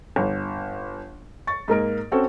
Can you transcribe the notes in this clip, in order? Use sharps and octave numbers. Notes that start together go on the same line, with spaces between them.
G1
C#6 A6
G#2 A#3 A#4 D7
C4 C#4 F#4 A4 C5 C#5